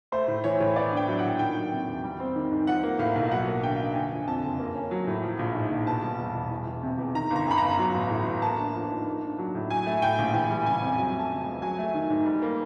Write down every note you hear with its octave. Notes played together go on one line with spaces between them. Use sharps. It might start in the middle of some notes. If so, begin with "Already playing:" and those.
A3 C5
A2
E3 C#5
A2
B3 D5
D4
G5
F#3
A#2 F#5
D#3 G5
F#3
C3
E2
G3
C4
D#3
G#2
F3 F#5
A#3
A2 F5
B1
F#3 F#5
A#3
D3 G5
F#2
D3 G#5
F3
F2 A5
F#1
A#3
C#4
F#3
A2
F3
A#1
G#2
A#1
B2 A5
G3
E2
E1
E3
E2
C3
E2
D#3 A#5
G1
A#5
F#2 B5
G1 A#5
F#3
A1
A2
A1
A#3 A5
D4
F3
G#2
A#3
D4
F#3
A2
F#3 G#5
A3
A2 G5
A#1
E3 G#5
G3
C#3 G#5
F2
F#3 G#5
A3
A5
C#3
C#2 G#5
F#3 G#5
A3
D#3
G#2
G3
A#3